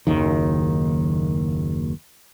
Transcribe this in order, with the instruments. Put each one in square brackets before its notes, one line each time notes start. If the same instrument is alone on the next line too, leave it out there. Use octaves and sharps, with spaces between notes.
[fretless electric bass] F#1 D#2 D#3